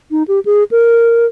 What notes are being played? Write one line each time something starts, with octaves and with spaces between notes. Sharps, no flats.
D#4
G4
G#4
A#4